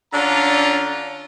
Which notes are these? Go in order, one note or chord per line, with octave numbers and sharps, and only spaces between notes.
D3 C#4 D4 F4 A#5